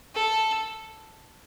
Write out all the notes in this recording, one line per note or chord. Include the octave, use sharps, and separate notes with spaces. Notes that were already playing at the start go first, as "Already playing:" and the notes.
A4